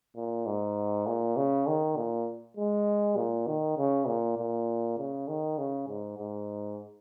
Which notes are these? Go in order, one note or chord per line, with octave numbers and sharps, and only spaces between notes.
A#2
G#2
A#2
C#3
D#3
A#2
G#3
A#2
D#3
C#3
A#2
A#2
C#3
D#3
C#3
G#2
G#2